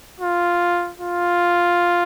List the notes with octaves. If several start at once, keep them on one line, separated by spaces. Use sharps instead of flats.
F4
F4